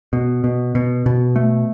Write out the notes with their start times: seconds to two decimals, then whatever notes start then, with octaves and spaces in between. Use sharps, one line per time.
0.13 B2
0.44 B2
0.75 B2
1.06 B2
1.36 A3